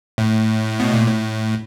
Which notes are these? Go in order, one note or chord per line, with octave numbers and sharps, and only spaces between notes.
A2
B2
A#2
A2